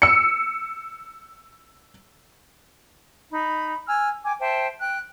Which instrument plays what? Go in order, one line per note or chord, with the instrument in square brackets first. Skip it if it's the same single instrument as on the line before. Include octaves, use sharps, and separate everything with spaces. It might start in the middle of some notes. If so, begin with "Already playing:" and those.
[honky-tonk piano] E6 C#7
[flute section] D#4 B5
G#5 E6 F6
G5 G#5 D6
C5 E5 G5 A5
G5 F#6